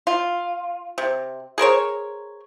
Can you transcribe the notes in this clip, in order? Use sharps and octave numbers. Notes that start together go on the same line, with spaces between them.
F4
C3
G#4 A#4 C5 C#5